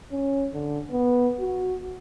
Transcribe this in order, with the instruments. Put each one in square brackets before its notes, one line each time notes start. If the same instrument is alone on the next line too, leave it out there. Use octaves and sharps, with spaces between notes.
[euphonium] C#4
D3
B3
F#4